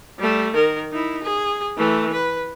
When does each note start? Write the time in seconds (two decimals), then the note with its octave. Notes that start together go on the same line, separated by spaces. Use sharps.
0.19 G3 A3
0.54 D#3 A#4
0.92 D#4 E4
1.23 G#4
1.77 E3 A3
2.13 B4